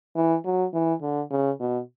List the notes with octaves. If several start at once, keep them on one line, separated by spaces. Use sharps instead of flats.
E3
F#3
E3
D3
C#3
B2